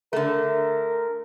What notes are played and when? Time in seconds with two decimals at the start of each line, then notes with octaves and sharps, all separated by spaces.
0.13 D3 A3 A#4